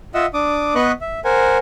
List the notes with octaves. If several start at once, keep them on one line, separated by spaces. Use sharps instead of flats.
F4 D#5 E5 F#5 E6
D4 D6 D#6
B3 B4 D#5 C#6 F#6
E5
A#4 C5 F#5 G#5